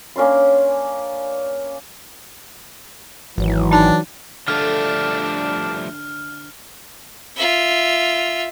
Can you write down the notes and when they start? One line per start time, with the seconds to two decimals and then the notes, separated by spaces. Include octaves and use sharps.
0.16 A#3 C#4 D4 C6
3.38 G#1 E3 F#3
3.72 D4 D#4 A5
4.48 D3 F3 G3 A3 D4 F6
7.36 F4 E5